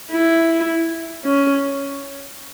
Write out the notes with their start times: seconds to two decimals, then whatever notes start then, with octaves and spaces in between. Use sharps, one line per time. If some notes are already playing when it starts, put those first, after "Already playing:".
0.11 E4
1.25 C#4